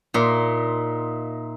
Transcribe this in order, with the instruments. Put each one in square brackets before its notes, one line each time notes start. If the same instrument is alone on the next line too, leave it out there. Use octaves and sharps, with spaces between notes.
[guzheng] A#2 [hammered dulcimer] D#4 E5 C6